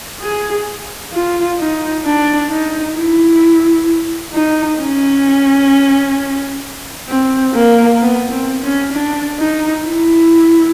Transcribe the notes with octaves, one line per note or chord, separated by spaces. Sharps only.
G#4
F4
D#4
D4
D#4
E4
D#4
C#4
C4
A#3
B3
C4
C#4
D4
D#4
E4